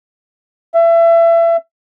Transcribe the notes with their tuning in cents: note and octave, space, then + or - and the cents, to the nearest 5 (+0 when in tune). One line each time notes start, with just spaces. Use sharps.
E5 +30